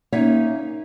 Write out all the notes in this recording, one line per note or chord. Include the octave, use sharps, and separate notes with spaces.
A#3 C#4 D#4 C#5 E5